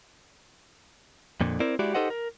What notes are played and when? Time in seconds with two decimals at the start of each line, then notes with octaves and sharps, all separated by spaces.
1.41 F2 A#2 D3
1.60 C4 E4 A#4 C5 D5
1.79 G#3 E4 F#4 G4 D5
1.94 D#4 G4 A4 C5 D#5 F#5
2.10 A#4